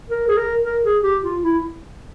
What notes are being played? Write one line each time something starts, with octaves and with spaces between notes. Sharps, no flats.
A#4
G#4
A#4
A#4
G#4
G4
F4
E4